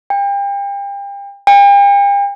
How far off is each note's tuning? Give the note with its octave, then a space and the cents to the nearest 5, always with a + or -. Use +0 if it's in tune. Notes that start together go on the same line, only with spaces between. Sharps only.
G5 +35
G5 +40